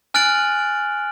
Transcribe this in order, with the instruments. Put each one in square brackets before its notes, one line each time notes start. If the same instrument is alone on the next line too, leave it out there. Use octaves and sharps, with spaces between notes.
[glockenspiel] G#5 F6 F#6 A6 D7 F#7